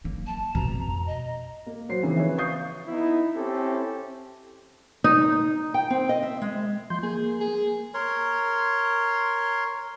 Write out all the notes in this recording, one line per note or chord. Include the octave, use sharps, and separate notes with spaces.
F#3 A#3
A5
F2 B2 A#5
D#5
A#3
F#3 F#4 C5 C7
C#3 E3 F3 A#3 C4 D#4
B4 C#5 E5
F5 C#6 D#6 G6 C7
B3 D#4 E4
C4 C#4 E4 G4 A4
D#4
G5
C4
D#5
E5
G#3
F3 C6 G6
A#3 G#4
G#4
A#4 C#5 C6